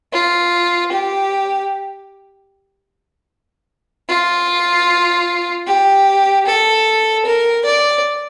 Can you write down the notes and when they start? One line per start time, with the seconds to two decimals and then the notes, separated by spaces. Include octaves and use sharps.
0.13 F4
0.92 G4
4.09 F4
5.67 G4
6.46 A4
7.26 A#4
7.65 D5